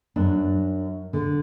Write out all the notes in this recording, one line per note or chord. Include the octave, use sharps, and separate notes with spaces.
F#2 D4
D3